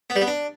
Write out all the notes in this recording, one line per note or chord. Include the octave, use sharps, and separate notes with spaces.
B3
G3
B3
D4